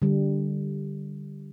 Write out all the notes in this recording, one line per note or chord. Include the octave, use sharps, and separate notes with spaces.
D3 G3